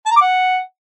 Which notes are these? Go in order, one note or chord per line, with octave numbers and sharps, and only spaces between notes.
A5
A#5
D6
F#5